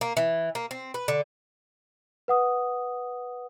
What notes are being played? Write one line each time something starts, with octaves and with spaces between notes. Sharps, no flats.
A#3
E3
A#3
C4
B4
D3
B4 F#5 D#6